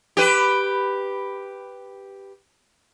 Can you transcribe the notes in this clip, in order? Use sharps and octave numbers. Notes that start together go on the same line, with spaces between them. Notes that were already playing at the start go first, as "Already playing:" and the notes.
G4 B4